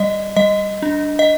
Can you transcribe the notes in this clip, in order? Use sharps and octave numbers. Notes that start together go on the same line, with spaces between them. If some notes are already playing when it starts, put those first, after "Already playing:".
Already playing: G3 D5 D#5
G3 D#5
D4
D#5